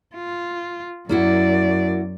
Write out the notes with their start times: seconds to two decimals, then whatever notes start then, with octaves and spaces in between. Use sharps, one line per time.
0.15 F4
1.09 F#2 A#3 E4 F#4 D5